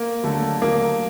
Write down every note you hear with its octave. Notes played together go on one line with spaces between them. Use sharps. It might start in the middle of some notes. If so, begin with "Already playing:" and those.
Already playing: A#3
D#2 D3 F#3 A3
D#2 D3 F#3 A3 A#3